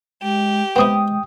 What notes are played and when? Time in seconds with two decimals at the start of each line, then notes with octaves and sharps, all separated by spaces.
0.22 G#3 G4
0.76 G#3 B3 C4 E4 G5 D#6